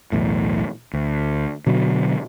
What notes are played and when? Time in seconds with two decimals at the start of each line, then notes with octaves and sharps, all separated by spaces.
0.12 B1 E2 A2
0.93 D2
1.67 B2 D3 F#3